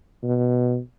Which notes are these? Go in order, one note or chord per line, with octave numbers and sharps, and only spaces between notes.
B2